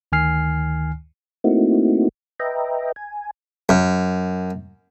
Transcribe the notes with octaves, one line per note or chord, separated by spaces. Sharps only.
D2 D#3 G#5 F6 C7
A3 A#3 C4 D#4 E4 F#4
B4 D#5 E5 G5 A#5
G#5
F#2